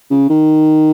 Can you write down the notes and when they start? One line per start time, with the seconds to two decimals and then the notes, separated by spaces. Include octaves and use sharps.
0.11 C#3
0.29 D#3